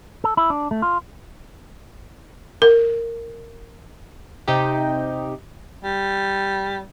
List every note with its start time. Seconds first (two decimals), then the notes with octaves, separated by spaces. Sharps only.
0.24 A4
0.37 E4
0.50 D4
0.71 A3
0.82 F4
2.62 A#4
4.48 C3 D#4 G4
5.84 G3